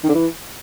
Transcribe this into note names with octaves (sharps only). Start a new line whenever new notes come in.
D#3
D3
E3